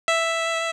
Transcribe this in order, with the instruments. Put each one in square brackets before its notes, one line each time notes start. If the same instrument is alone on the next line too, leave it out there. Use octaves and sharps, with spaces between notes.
[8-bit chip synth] E5